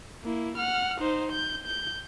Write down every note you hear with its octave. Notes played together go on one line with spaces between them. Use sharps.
A#3 E4
F#5 F6
D#4 C5
G6
G6